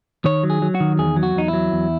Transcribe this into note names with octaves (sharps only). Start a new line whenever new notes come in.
D#3 C#5
F#3
G#4
F#3
F#4
D#3
E2 G#4
F#3
F#4
E2 D#4
E4
F#3
E2